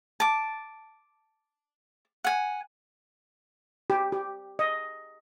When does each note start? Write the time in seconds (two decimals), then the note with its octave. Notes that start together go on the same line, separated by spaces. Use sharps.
0.20 A5 D6
2.24 F#5 G#5
3.90 G4
4.12 G4
4.59 D#5